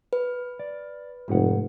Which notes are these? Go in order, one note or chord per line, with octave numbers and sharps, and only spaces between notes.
B4
D5
F1 G#2 F#5